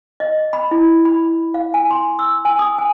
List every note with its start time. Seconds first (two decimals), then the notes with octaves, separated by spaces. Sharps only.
0.20 D#5
0.53 B5
0.71 E4
1.05 B5
1.54 F5
1.74 G#5
1.91 C6
2.19 E6
2.45 G#5
2.59 D#6
2.78 G#5